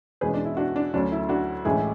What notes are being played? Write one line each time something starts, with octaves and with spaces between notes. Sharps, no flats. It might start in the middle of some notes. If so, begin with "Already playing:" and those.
E2 B2 G#3 C#4 G#4 B4
D4
E4
D4 F#4
D4
D2 D3 F#3 C#4 D4
E4
D4 F#4
A1 A2 G#3 C#4 E4 G#4